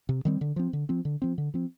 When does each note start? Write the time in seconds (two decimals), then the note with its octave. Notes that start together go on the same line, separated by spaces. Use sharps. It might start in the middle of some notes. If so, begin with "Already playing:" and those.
0.09 C3
0.25 D#3 G3 C4
0.41 D3
0.56 F3 C4
0.73 D3
0.89 F3 C4
1.05 D3
1.22 F3 C4
1.38 D3
1.54 F3 C4